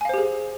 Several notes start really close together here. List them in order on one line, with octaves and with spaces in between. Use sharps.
G#5 F5 C5 G4 G#4